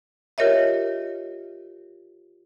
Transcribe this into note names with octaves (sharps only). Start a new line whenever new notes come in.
F4 G4 A#4 C#5 D#5 E5